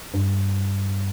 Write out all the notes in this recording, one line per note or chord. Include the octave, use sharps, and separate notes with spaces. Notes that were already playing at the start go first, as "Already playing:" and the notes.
G2